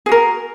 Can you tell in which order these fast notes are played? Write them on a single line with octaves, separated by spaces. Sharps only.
G#4 F#4 A#4